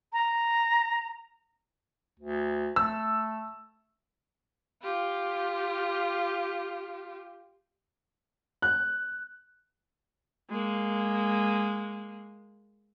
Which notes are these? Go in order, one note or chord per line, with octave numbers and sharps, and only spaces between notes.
A#5
D2
A3 E6
F4 G4
F#6
G#3 A#3